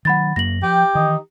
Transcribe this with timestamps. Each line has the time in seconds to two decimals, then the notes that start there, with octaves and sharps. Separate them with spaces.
0.05 D#3 F#3 F#5 B5 A6
0.36 F#2 A#3 A#6 F#7
0.63 F3 G4 G5
0.95 D#3 E3 D#4